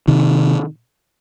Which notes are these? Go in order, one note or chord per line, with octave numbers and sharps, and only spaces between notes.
C3 D#3